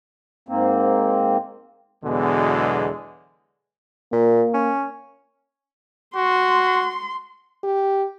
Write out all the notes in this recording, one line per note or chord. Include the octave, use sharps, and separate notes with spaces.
G#2 A#3 C4
E2 B2 D3 F#3 G#3
A#2 A#3
C#4
F#4 C6
G4